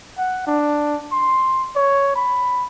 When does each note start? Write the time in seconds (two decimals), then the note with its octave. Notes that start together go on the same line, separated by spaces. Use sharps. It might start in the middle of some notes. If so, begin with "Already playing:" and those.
0.18 F#5
0.47 D4
1.12 C6
1.76 C#5
2.16 B5